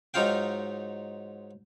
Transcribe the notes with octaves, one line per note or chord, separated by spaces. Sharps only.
G#2 F#3 D#4 F4 F5 G5